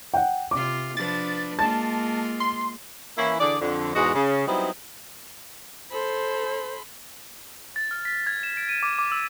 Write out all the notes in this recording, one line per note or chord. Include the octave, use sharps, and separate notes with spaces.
F#5 G5
C3 F4 D6
F3 D4 B4 A6
G#3 A#3 F4 A5 A6
C6
E3 A#3 C#4 E4
D3 E3 G#4 D5
F2 D3
E2 G#2 G#3 F#4 D#5
C#3
F#3 G3 B3 C4 D#4 E4
A4 C5 B5 C6
A6
F6
B6
G#6
E7
D7
D#7
D6
D6
E6